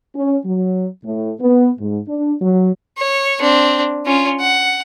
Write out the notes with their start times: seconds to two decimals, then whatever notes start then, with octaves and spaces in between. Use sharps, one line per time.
0.15 C#4
0.45 F#3
1.04 A2
1.41 B3
1.79 G#2
2.08 D4
2.41 F#3
2.98 C#5
3.41 C4 D4
4.06 C#4 F4
4.40 F#5